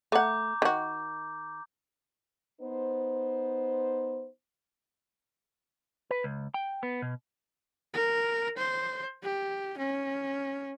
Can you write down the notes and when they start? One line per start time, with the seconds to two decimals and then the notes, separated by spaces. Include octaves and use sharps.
0.12 A3 F#5 A#5 D6 G6
0.62 D#3 F#4
2.61 B3 D#4 C5
6.11 B4
6.24 C#2
6.54 G5
6.83 B3
7.02 B2
7.94 A#4
8.58 C5
9.23 G4
9.78 C#4